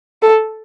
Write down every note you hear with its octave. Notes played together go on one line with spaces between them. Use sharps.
A4